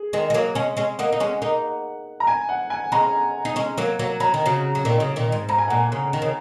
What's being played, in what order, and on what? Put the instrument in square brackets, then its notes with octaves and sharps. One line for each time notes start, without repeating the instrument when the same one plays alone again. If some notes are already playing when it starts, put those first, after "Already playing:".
Already playing: [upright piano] G#4
[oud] D#3 G#3
G#3
F#3 A#3
G#3 C#4
G#3 C#4
[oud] A#3 D#4 [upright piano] F#5
[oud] D#4
G#3 C#4
A#3 D#4
[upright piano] A#5
G#5
F#5
G#5
[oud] G#3 C#4 [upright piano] A#5
[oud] D#4
G#3 C#4
F#3 A#3
F#3 A#3
[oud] F#3 [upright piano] A#5
[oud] D#3
C#3 F#3
F#3
A#2 D#3
C#3 F#3
A#2 D#3
G#2
[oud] G#2 [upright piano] A#5
[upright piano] G#5
[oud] A#2 [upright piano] F#5
[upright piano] G#5
[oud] C#3
D#3
C#3